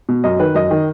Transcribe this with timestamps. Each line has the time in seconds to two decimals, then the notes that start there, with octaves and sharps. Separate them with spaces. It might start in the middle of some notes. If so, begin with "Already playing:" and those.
0.09 B2
0.24 F#2 D#5
0.40 D#3 B4
0.55 F#2 D#5
0.71 D#3